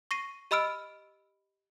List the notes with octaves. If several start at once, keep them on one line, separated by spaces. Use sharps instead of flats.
C#6 A#6 C7 D#7
G4 D#5 B5 E6 F6 D7